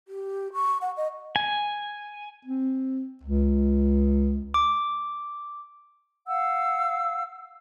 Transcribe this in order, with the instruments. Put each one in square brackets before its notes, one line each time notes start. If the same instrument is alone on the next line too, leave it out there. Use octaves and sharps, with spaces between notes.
[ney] G4
C#6
F#5
D#5
[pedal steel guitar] G#5
[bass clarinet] C4
C#2
[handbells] D6
[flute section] F5 F#5 E6